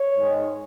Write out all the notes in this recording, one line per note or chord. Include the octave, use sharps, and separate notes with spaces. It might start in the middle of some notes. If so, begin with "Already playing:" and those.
Already playing: C#5
G#2 D#3 G#3